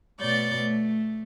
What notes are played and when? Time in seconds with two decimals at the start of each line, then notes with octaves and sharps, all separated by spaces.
0.20 B2 A3 C#5 D5 G6 A6
0.56 A3